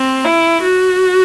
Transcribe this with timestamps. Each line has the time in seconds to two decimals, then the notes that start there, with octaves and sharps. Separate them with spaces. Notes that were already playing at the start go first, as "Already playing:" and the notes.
Already playing: C4
0.25 E4
0.62 F#4